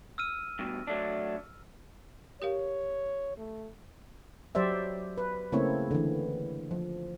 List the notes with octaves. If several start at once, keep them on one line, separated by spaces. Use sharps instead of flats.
E6 F6 D#7
G2 B2
F#3 A3 D4
G4 A#4 C#5 F5
A3
F#3 G4 C5 D5 E5
B4
C#3 A3 A#3 C4 E4 C#5
D3 E3
F3